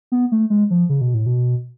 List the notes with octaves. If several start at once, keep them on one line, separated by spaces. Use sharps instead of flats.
B3
A3
G#3
F3
C#3
B2
A2
B2